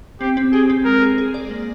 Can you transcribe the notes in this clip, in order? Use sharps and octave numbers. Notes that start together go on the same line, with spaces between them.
C4 G4
C4
G4 G#4
C4
G#3 A#4
G#4
G#4
D5
A#3